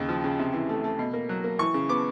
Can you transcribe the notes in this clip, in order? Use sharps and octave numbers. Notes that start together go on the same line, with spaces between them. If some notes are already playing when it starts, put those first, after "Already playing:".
Already playing: D#2 C#3
F3
C#3
C3
E3
A3
A3
B2
A#3
F#3
A#3
E3 C#6
C#3
B3 D6